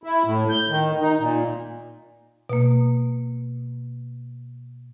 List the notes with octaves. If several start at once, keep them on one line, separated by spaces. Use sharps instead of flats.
E4
A2
G6
D#3
D#4
A#2
B2 A#3